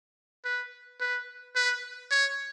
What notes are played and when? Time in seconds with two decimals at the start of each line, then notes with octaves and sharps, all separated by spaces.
0.45 B4
1.00 B4
1.55 B4
2.11 C#5